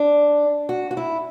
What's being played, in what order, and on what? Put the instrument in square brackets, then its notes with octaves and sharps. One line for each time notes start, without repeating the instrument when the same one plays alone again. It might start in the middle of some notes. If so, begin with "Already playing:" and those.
Already playing: [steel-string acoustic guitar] D4
F#4
F#4
E4